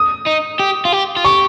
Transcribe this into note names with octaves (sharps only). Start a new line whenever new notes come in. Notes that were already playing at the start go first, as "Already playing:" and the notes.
Already playing: D#6
D#4
G4
F4
G4
F4
G4 C#6